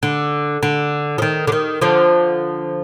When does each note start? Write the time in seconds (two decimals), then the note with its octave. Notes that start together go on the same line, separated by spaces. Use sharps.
0.03 D3
0.63 D3
1.18 F3
1.22 D#3
1.47 D3
1.52 D#3
1.81 D3 F3